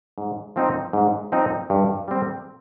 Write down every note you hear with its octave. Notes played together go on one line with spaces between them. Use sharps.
G#2
F3 C4 D#4
G#2
F3 C4 D#4
G2
G3 C4